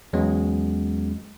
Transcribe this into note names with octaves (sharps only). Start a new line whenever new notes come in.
E2 F#3 G#3 B3 C#4